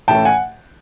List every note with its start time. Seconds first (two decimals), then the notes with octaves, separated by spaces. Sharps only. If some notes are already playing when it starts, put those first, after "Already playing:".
0.08 A2 E3 A3 C#4 G5 A5
0.25 F#5 G#5